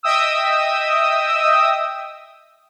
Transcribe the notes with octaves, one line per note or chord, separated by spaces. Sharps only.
D#5 E5 G5 D#6 E6